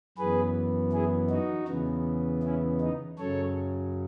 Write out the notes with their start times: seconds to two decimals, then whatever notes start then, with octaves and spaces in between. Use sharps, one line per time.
0.17 F#2 E3 B3 G#4 B4
0.93 E4 G#4
1.30 D#4 F#4
1.68 E2 C#3 E3 B3
2.43 C#4 E4
2.81 D#4
3.18 F#2 C#3 F#3 A4 C#5